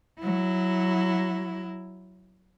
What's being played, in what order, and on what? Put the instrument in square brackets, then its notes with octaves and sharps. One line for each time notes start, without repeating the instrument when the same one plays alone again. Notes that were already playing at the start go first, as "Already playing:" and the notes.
[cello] F#3 E4